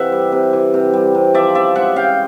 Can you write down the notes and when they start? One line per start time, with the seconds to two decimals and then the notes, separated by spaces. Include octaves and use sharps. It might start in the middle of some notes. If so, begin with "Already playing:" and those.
Already playing: C3 E3 E5 F#5
0.12 G3
0.32 C3
0.53 E3
0.74 C3
0.93 G3
1.15 C3
1.34 F3 D5 E5
1.55 C#3 D5 E5
1.76 G#3 E5 F#5
1.96 C#3 F5 G5